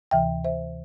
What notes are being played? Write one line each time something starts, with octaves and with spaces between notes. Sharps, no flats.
D2 C3 E3 E5 G5
C5 E5